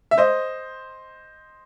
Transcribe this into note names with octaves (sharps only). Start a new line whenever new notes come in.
E5
C5 D#5